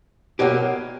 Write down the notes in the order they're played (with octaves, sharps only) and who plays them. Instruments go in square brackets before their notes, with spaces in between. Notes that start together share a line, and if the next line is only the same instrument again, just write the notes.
[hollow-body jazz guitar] B2 F#3 A#3 G4